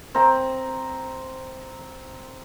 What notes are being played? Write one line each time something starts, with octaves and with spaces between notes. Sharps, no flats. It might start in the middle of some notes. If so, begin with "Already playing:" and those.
C4 A#5